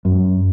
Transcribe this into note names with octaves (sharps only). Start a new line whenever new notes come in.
F#2